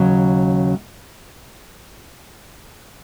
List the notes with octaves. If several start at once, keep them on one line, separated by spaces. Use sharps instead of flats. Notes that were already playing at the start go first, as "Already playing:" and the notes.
Already playing: D#2 C#3 F#3